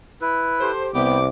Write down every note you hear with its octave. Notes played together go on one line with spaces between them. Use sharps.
E4 B4
G4 A4 C5
C2 B3 G4 G5 D6